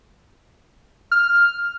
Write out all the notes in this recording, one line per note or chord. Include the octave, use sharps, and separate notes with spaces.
F6